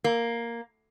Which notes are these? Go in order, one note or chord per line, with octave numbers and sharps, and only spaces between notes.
A#3